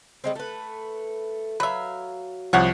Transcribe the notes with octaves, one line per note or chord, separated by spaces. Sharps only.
G3 G#3 C4
A3 B4
F#3 B4 E5 F5
C2 F3 C#5 F#5